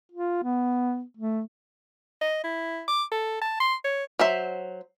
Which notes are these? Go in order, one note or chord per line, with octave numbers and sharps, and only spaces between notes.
F4
B3
A3
D#5
E4
D6
A4
A5
C6
C#5
F#3 C5 E5